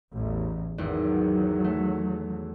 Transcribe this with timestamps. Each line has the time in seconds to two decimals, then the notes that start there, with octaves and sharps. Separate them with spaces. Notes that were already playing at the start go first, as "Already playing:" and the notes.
0.13 A1 E2
0.78 G#1 E2 F#3
1.64 A3